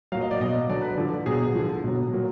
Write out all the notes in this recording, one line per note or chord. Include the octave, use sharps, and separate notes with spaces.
A#2 F#3 F5
D#5
D5
B2 F#3 D#5
D3 F#3 D5
B4
D3 F3 D5
B2 F#3 G#4
D3 F3
B2 F#3
A#2 F#3